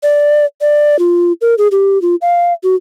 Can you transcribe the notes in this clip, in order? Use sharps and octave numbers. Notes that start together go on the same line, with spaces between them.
D5
D5
F4
A#4
G#4
G4
F4
F5
F#4